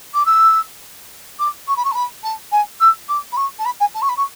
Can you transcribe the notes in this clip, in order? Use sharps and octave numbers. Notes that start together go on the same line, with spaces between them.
D6
E6
D6
C#6
B5
C#6
A5
B5
A5
G#5
E6
D6
B5
C#6
A5
B5
G#5
A5
C#6
B5
C#6